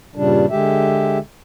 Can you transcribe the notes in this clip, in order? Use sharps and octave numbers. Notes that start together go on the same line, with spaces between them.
G2 A#2 C#3 G3 D4
D3 G#3 G4 E5